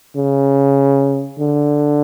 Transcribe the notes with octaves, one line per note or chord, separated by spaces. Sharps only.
C#3
D3